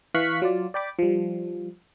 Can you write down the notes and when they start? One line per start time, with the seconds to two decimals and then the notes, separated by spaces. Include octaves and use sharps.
0.14 E3 F5 C#6 F#6 B6
0.42 F#3 F4 D5
0.74 D5 G5 B5 D6
0.99 F3 G3